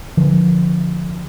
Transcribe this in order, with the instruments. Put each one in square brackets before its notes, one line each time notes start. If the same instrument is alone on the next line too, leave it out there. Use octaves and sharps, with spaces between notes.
[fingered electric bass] D3 F3